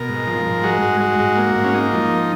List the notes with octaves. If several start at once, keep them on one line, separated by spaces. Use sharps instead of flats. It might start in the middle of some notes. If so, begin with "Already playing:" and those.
Already playing: B2 A#4
G#2
F3
G#2
G#3 F#4
G#2
G#3
G#2
A#3
G#2
C#4
A#3 D#4
F3